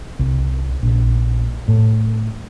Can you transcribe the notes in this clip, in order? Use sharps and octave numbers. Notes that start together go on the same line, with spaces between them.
C2
A#1
A2